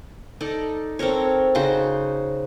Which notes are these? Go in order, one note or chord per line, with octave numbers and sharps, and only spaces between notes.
D#4 A4 D5
C4 A4 A#4 C#5
C#3 D#4 F#4 C5